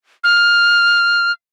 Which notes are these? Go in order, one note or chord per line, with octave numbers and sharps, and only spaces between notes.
F6